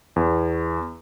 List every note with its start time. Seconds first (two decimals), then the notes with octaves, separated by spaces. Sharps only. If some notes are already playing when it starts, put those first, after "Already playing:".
0.16 E2